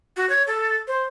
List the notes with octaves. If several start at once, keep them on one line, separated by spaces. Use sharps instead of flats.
F#4
C#5
A4
C5